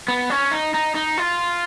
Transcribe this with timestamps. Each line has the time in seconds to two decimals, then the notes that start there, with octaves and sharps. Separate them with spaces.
0.08 B3
0.30 C#4
0.51 D#4
0.74 D#4
0.95 D#4
1.18 F4